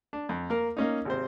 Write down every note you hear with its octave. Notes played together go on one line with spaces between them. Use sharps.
D4
F2
A#3 A#4
A#3 C#4 D#4
G#1 C3 C5